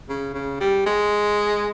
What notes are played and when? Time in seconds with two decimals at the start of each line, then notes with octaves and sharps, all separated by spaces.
0.09 C#3
0.35 C#3
0.61 G3
0.86 G#3